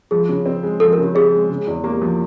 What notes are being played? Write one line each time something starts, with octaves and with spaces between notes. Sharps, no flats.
F3 G#4
C#3
C4
G#3
F3 A4
A#4
C#3
G4
C4 G#4
G#3
C#3
E2
A#3 G4
F3